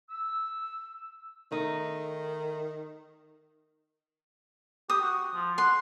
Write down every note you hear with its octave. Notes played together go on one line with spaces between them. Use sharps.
E6
D#3 A3 D#4
G4 D#6
F#4
F3
F#5 C6